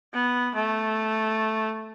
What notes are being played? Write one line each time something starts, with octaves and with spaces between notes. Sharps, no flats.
B3
A3